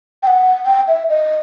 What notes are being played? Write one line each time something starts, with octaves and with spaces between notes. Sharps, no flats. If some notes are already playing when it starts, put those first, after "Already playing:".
G5
F#5
G5
E5
D#5